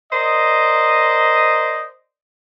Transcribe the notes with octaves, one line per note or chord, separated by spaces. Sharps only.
A#4 C5 D5 D#5